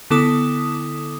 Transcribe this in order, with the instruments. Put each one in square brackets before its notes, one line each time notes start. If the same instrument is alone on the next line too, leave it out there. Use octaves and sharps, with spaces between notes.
[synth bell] D3 B3 E4 A4 D6 D#6